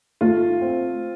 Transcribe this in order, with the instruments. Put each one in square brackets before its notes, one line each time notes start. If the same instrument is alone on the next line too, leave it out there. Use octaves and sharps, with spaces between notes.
[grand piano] A3 [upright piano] F4
[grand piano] C4